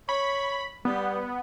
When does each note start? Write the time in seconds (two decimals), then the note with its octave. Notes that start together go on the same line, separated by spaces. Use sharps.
0.09 C#5 B5
0.85 G3 B3